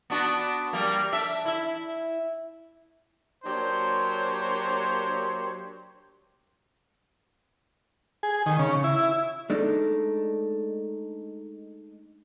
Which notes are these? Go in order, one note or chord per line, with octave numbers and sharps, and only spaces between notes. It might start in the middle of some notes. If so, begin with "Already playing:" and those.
B3 D4 F#4
G3 A#3
D4 E5
E4 E5
F#3 A#3 D4 G4 C5 C#5
G#4
D#3
C#3
E4
G#3 A3 D4 D#4